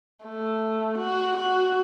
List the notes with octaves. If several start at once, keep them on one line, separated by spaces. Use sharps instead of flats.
A3
F#4
F#4